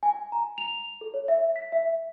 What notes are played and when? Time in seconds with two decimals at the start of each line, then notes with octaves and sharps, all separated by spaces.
0.03 G#5
0.32 A#5
0.58 F7
1.01 A4
1.14 C#5
1.28 E5
1.56 B6
1.72 E5